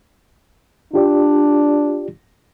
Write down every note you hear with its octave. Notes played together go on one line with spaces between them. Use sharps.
D4 F4 G4 D5